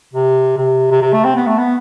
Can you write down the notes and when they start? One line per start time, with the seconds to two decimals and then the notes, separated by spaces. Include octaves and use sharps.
0.14 C3
0.58 C3
0.91 C3
1.02 C3
1.13 A3
1.25 C4
1.36 B3
1.47 A3
1.58 B3